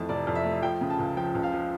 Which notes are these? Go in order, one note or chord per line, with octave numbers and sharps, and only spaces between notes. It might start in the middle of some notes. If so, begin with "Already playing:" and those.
Already playing: F2 E3 A3 A5
F1 D5
F2
E5
A3
F3 G5
C#3
A5
C#2
F3 G5
C#2
F5
F3